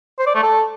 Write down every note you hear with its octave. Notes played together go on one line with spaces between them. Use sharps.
C5
D5
A3
A4